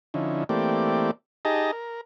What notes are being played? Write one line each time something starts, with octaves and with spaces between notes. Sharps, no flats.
D3 F3 C#4 D#4 E4
E3 A3 A#3 C4 G4 D5
D#4 G4 G#4 D#5 A5 A#5
A#4